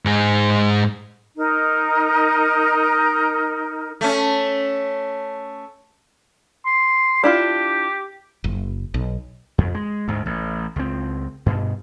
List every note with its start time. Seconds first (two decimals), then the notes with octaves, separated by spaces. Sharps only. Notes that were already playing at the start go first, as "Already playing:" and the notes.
0.05 G#2 G#4
1.36 D#4 A#4
4.01 A3 C#4
6.66 C6
7.24 D4 E4 F4 G4
8.44 F#1
8.94 B1
9.58 F2
9.75 G#3
10.08 D2 G#2
10.26 A1
10.76 C#2 C4
11.46 G2 B2